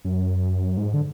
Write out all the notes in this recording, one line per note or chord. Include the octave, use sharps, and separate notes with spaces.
F#2
G#2
D3